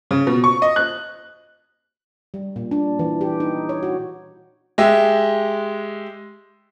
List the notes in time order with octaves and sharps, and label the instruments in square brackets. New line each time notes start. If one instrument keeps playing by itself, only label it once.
[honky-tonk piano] C#3
B2
C#6
D#5
F#6
[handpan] G3
A#2
D4
E3
G4
D#4
C#5
F#4
[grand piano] G#3 G4 E5